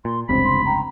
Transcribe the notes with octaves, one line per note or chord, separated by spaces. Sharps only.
A#2 C6
F1 C#2 G2 C4 B5
C6
G5 A#5